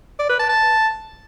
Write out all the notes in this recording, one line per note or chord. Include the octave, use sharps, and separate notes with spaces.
D5
B4
A5
A5